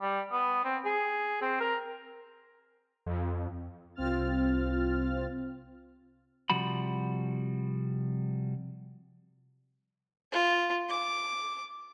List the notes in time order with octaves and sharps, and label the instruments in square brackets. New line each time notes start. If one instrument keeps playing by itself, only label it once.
[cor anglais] G3
B3
C4
G#4
C4
A#4
[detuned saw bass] F2
[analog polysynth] C2 C4 F4 F6 A6
[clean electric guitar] C3 F3 G3 F#4 B5
[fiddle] F4
D6